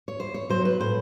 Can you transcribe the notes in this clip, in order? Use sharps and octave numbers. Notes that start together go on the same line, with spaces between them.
C#5
E2 C5
C#5
B2 F#3 C5
B4
A2 C5